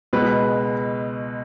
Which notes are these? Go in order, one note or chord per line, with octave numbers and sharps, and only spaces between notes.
C#2 B2 G#3 B4